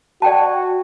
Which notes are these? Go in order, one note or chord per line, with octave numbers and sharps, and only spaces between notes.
F#4 D5 G5 A5